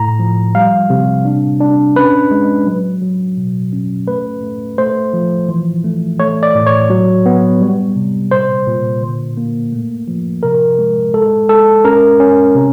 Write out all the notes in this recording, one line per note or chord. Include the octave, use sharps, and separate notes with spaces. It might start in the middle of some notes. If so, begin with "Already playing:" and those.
Already playing: A2 A#5
F3
G3 F5
C3
D4
D4
C#4 B4
G#3
F#3
F#3
B2
C#4
A3 B4
A3
A3 C5
F3
E3
A3
A3 C#5
D5
A2
C#5
F#3
B3
G3
C3
A#2 C5
A#2
D3
A#3
A3
F3
C3 A#4
G#3
G#3 A4
G#3 A4
C#4 A#4
C#4
C3